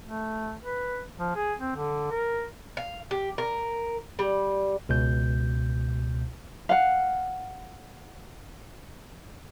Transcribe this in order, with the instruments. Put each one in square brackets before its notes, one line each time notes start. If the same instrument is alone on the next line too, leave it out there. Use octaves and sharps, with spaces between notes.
[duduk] A3
B4
F3
G#4
C4
D3
A#4
[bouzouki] F5
G4
A#4
G3
[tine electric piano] C#2 B2 G6
[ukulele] F5 F#5